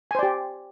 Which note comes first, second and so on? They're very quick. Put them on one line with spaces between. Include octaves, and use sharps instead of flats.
G#5 C5 D5 G4